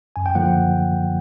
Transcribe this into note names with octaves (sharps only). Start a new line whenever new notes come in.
F#2 G#5
G5
D3 F3 A#3 F#5